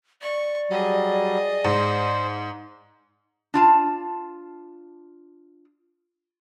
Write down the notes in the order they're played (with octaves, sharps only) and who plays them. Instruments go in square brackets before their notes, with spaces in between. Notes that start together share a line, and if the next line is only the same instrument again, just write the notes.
[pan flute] D5 [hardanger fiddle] C#6
[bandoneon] F#3 G3 [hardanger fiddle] G#4 D#5
[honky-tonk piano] G#2 [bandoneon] C5
[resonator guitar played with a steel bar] D4 F4 A5